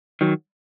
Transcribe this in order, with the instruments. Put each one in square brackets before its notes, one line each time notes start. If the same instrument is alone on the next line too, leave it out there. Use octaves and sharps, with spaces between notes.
[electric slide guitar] D#3 F#3